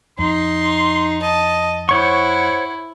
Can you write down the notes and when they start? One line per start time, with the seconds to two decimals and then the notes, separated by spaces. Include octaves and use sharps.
0.19 F2 D#4 C6
1.22 D#5 A5
1.89 E4 C5 C#5 F#5 C#6